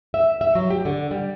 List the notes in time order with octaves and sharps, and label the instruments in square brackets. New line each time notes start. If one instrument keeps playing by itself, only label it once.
[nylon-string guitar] E5
E5
F#3
G4
D3
G3